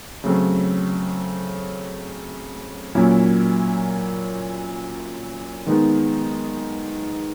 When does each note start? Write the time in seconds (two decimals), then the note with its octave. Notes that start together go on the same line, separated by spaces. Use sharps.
0.24 C#3 F#3 A3 C4
2.95 A#2 F#3 A#3 C#4 E4
5.66 D#3 G#3 B3 D#4